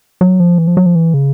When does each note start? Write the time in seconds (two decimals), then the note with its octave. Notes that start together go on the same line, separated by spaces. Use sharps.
0.21 F#3
0.40 F3
0.58 E3
0.67 F3
0.77 F#3
0.86 F3
0.95 E3
1.14 C#3